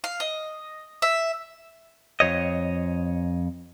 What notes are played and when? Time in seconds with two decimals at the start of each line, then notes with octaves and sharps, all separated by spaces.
0.04 F5
0.20 D#5
1.02 E5
2.20 F2 C#5 D#5